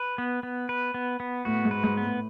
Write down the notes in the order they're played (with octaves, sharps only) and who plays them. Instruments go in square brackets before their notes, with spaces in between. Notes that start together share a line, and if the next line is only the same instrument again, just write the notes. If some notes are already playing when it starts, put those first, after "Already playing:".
Already playing: [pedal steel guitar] B4
B3
B3
B4
B3
B3
[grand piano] A2 [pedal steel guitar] F#4
[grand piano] G#2
[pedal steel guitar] B4
[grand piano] G#2
[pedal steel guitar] B3
[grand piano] A2